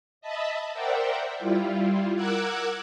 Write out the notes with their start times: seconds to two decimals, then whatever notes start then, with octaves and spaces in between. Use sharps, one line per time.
0.21 D#5 E5 A5 B5
0.74 A#4 C5 D5 E5 F#5 G5
1.39 G3 E4 F4
2.16 A#4 F#5 D6 E6 F#6 G#6